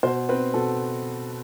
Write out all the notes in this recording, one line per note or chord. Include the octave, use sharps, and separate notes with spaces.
B2 C5
C4 B4
B2 A4